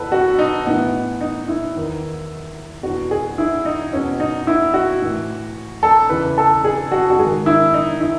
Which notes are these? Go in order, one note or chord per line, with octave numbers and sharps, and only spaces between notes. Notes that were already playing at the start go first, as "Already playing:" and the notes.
Already playing: E2 B2 A4 B4
F#4
D#4
A2 E3 B3
D#4
E4
E2 D#3
E2 B2 F#4
G#4
E4
D#4
E2 B2 C#4
D#4
E4
F#4
A2 E3
A4
E2 C#3 E3 B4
A4
G#4
F#4
F#4
G#2 D#3 G#4
E4
D#4
E4